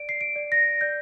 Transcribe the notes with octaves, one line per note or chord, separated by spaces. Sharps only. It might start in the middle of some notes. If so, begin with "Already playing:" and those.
Already playing: D5 D7
C7
D7
D5
A#6
D5 G6